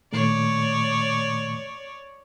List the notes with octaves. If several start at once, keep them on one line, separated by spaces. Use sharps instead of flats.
A#2 D#3 A3 C#5 D5